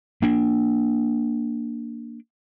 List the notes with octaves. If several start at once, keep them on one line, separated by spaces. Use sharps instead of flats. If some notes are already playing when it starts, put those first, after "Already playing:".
A#3 D4